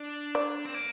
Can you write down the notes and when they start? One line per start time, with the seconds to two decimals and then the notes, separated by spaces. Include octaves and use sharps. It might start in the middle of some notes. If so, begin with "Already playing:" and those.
Already playing: D4
0.35 D5
0.65 C4
0.74 A#3